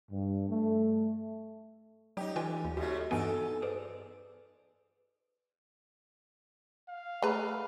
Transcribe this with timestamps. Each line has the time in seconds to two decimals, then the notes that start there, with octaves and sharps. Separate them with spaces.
0.11 G2
0.49 A3
2.17 F#3 C#4 D#4 G4 D5
2.36 E3 F4 A4 B4 D#5 G5 G#5
2.65 D#2 F5
2.77 G#2 C#3 A3 F#4 G4 D5
3.11 G2 E3 B3 D#4 A4 B4 G#5
3.62 G#4 B4 C5 D5
6.89 F5
7.22 A3 G#4 B4 A#5 B5